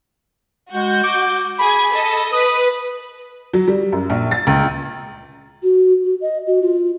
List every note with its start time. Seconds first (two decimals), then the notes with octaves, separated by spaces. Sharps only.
0.73 G#3 F#4 G6
1.04 D6
1.59 G#4 B5 G#6
1.93 A4 D#5
2.33 B4 D#6
3.54 F#3
3.68 G3
3.92 F#2
4.10 A#1
4.31 A6
4.47 C#2
5.63 F#4
6.04 F#4
6.21 D#5
6.47 F#4
6.62 F4